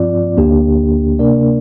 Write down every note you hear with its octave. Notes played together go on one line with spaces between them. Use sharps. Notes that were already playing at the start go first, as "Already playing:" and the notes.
Already playing: G2 F3 C4 F4 D5
D2 D3 A#3 D4 G4
C3 A#3 D4 A#4 D5